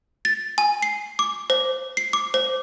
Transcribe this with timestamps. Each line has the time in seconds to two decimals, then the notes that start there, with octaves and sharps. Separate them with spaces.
0.25 A6
0.58 G#5
0.82 C7
1.19 D6
1.50 C5
1.97 C7
2.13 D6
2.34 C5